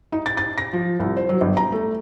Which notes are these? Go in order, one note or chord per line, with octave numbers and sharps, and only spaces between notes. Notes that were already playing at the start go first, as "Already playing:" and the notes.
D#4
A6
A6
A#6
F3
C2
C5
F#3
G1
A#5
A3